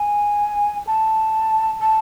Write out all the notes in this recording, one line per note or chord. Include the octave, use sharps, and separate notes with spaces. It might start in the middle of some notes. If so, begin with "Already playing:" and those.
Already playing: G#5
A5
A5